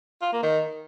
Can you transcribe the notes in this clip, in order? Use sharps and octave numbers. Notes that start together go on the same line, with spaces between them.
F4
A#3
D#3